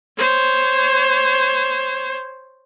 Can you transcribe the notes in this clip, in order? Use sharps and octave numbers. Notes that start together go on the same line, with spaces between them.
C5 C#5